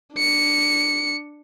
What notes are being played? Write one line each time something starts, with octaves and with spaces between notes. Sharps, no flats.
D4 C#7